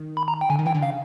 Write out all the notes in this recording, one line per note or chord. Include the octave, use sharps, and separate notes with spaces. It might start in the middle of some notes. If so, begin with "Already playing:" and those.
Already playing: D#3
B5
A#5
G5
D3 G#5
D#3
E3 G5
D3
C#3 F5